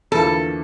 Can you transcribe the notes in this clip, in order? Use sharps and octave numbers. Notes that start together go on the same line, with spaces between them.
E2 D3 F3 A#3 E4 A4